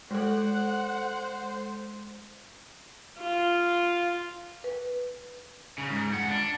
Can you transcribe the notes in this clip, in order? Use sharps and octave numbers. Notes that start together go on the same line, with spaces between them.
G#3 A4 C5 F#5
F4
B4
C#3
G#2
F2 F#5
D4